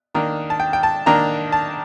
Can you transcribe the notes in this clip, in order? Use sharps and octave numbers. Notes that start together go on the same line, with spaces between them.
D#3 A#3 D4 A#5
A5
G5
G5
A5
D#3 A#3 D4 A#5
A5